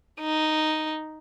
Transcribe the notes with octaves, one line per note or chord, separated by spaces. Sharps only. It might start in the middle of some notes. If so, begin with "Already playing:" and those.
D#4